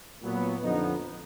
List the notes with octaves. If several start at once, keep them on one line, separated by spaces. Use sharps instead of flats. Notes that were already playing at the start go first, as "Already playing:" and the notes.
A#2 F#3 B3
F2 D3 F3 B3 D#4